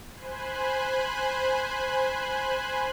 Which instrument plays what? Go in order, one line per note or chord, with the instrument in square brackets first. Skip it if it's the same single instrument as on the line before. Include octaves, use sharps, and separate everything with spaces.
[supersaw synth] C5 G#5 B5 F#6